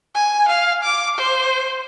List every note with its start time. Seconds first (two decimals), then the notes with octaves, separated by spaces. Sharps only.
0.15 G#5
0.48 F5
0.83 D6
1.18 C5